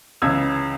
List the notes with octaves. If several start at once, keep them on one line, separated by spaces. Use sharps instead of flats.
C#2 C#3 E3 E6 G#6